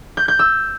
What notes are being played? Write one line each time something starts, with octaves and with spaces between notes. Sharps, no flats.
G6
G6
E6